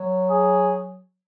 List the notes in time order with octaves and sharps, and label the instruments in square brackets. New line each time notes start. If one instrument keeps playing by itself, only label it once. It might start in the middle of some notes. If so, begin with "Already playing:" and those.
Already playing: [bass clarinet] F#3
[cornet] G#4